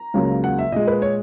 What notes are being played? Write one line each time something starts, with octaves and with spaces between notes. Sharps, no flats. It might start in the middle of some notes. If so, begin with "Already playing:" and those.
Already playing: A#5
C#2 C#3 F#3 A#3
F#5
E5
A#2 G#3 D#5
B4
C#5